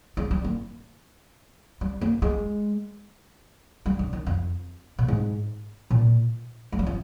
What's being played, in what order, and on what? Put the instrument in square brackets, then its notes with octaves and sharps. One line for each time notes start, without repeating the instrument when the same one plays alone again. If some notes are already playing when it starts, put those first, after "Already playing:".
[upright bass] G#3
G3
A#3
G3
A#3
G#3
G3
D3
D#3
F2
A#2
G#2
A#2
G#3
G3
F3